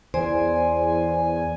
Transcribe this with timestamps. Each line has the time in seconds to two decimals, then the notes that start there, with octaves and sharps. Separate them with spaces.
0.14 E2 C5 D5 G#5